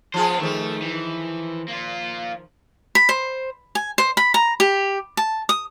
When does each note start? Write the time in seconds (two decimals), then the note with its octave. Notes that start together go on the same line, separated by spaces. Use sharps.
0.14 F3 B3 F4 G#4 C5
0.40 D#3 F3 A3
0.82 E3
1.68 A#3 F4
2.95 B5
3.09 C5
3.75 G#5
3.98 C5
4.17 B5
4.34 A#5
4.60 G4
5.17 A5
5.49 D#6